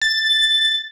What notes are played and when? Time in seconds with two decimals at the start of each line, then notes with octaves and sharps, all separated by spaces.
0.02 A6